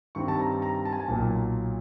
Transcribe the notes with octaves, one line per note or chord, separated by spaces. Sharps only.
G2 D#3 G3 C4 C#6
A5
A#5
A#5
A5
G#5
A5
B1 A#2 F#3 A#3